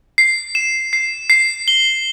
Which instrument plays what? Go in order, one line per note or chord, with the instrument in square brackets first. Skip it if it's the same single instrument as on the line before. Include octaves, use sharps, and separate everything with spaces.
[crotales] C7
E7
C7
C7
G7